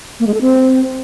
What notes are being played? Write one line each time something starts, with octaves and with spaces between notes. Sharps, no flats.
A#3
G#3
A4
C4